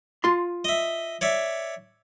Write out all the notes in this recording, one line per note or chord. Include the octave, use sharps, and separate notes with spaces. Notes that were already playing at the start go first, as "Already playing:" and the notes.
F4 C6
D#5 E5
C#5 D5 E5